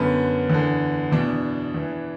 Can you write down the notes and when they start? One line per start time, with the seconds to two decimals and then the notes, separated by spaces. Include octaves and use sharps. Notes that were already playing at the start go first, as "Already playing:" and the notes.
Already playing: F#2 D3 B3
0.50 E2 D3
1.12 E2 B2 D4
1.74 E2 E3